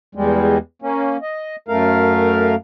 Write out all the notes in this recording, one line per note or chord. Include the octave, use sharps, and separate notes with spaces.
E2 G3 G#3
A#3 C#4
D#5
F#2 A3 A#4 F5